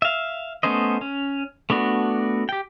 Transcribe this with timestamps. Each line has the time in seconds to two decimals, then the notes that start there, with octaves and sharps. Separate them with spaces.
0.02 E5 F5
0.63 A3 B3 C#4 C5 D#5
1.01 C#4
1.70 A3 B3 D4 F#4
2.49 G4 G5